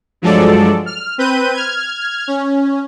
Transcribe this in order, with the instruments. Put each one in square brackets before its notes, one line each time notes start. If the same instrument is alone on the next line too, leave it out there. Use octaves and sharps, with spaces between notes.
[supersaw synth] G2 F3 F#3 G#3 A4 D5
F6
C4 B4 G6 D#7
F6 G#6
C#4